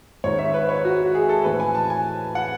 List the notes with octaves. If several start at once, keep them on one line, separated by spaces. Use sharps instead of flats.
G#2 D#3 C#5
E5
B4
C#5
F#4
G#4
A4
A2 E3 B4
G#5
A5
G#5
F#5